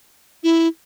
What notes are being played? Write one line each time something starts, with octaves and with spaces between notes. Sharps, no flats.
E4